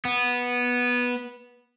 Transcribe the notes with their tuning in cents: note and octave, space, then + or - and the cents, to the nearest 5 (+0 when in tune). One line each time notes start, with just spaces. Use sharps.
B3 -10